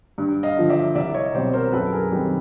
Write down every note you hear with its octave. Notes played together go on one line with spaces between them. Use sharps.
G2
D#5 F5
D3 F3
D5 E5
C2 D5 E5
C#5 D#5
B2 G3 C4 C5 D5
A#4 C5
F#2 A4 B4
G#4 A#4
D#3 G3 C4